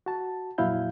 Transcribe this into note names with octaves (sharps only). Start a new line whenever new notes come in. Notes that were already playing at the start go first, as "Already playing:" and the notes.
F#4 A5
F2 A#2 F#3 E4 F5 G6